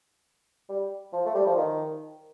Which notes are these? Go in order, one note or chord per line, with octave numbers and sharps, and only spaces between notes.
G3
F3
A3
G3
F3
D#3